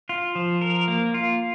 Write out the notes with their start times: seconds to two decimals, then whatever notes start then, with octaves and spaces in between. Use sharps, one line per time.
0.09 F4
0.35 F3
0.61 A#4
0.88 A#3
1.14 F4